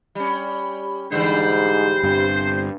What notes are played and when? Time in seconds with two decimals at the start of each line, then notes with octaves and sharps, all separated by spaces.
0.15 G3 C#4
1.12 G#2 D3 E3 G3 C5
2.03 G1 G2 C3